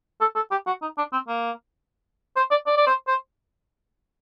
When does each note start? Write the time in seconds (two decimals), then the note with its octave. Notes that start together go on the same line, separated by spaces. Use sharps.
0.21 A4
0.36 A4
0.51 G4
0.67 F#4
0.82 D#4
0.98 D4
1.13 C4
1.28 A#3
2.37 C5
2.51 D5
2.67 D5
2.77 D5
2.87 C5
3.08 C5